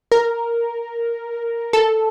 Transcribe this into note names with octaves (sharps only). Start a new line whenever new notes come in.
A#4
A4